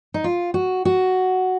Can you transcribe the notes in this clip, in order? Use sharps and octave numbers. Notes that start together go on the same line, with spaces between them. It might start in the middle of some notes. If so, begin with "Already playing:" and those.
D#4
F4
F#4
F#4